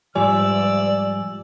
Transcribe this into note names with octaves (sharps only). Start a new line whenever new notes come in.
G#2 F3 G3 D5 G#5 E6